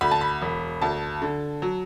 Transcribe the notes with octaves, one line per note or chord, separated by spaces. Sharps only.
D2 B5
A5
B5
E1
D2 A5
D3
F#3